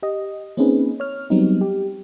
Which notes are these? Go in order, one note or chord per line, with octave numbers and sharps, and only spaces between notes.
G4 D#5
A#3 C4 C#4 D#4 G#4 B4
C#5 F6
F#3 G3 B3 C4 D#4
G4